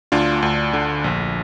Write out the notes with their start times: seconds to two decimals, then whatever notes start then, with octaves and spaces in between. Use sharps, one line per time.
0.12 D2 D4 F4
0.42 D2
0.73 D3
1.04 A#1